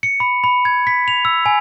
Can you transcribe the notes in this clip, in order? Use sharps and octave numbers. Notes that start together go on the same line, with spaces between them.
C#7
B5
B5
G#6
B6
F7
E6
G#5